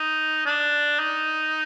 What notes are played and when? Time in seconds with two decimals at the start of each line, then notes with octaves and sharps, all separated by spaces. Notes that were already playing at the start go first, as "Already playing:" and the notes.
Already playing: D#4
0.46 D4
0.99 D#4